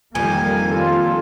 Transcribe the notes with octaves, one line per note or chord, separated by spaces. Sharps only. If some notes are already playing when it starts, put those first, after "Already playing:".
F2 D#3 G3 A#3 G#5
F4 A4